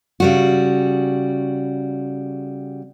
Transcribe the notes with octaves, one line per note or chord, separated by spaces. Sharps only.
C#3 G3 F#4